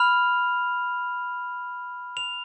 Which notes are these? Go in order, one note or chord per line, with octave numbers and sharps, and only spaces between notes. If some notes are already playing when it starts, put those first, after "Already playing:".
Already playing: B5 F6 F7
F7